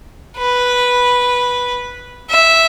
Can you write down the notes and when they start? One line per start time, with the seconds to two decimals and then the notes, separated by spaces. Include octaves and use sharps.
0.38 B4
2.30 E5